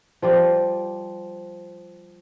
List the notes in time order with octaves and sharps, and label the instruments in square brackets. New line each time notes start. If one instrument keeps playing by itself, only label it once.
[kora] F3 G3 D5